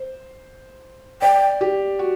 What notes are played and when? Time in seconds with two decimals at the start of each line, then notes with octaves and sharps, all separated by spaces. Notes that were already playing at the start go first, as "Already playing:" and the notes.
Already playing: C5
1.22 D5 G5
1.61 G4
1.99 F#4